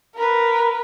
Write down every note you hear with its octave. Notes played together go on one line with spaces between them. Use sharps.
A#4 B4